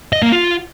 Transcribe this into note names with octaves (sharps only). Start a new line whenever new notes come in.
D#5
A#3
F4